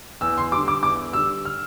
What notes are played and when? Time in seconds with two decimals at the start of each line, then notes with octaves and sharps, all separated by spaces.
0.21 E2 E6
0.38 C6
0.52 D3 G3 D6
0.68 D6
0.83 E2 D6
1.13 D3 G3 E6
1.45 F6